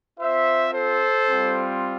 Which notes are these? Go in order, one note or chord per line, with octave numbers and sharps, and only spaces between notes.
C4 F4 C5 E5
A4 C5
G3 C4 F4